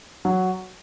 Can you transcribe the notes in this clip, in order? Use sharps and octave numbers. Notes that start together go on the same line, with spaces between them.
F#3